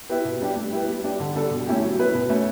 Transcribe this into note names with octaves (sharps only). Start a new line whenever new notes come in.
B3 E4 G4 B4
B2
G3 D4 G4
A3
E4 G4 B4
G3
D4 G4
D3
G3 D4 A4
B2
A3 C#4 E4 G4
F#3
B3 E4 B4
B2
A3 C#4